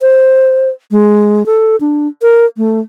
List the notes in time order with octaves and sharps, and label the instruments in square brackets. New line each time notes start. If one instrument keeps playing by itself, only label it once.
[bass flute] C5
G#3
A4
D4
A#4
A3